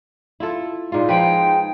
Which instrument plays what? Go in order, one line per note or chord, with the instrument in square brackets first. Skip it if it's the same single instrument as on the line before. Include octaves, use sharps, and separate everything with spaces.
[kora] E4 F4 A4
[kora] A#2 F4 [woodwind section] G#3 D#4
[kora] F3 B4 [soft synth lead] G5